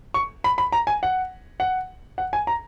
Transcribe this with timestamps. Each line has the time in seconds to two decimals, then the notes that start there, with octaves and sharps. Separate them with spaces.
0.14 C#6
0.44 B5
0.58 B5
0.72 A#5
0.87 G#5
1.03 F#5
1.60 F#5
2.18 F#5
2.33 G#5
2.47 A#5